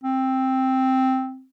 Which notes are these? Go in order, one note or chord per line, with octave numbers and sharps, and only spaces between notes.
C4